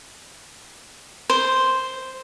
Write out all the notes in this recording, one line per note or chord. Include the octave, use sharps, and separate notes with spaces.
C5